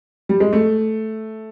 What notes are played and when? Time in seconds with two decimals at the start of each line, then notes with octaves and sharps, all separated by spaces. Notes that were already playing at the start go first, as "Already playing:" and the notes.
0.29 G3
0.40 G#3
0.53 A3